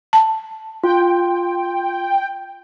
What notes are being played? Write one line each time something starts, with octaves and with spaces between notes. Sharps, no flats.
A5
F4 G5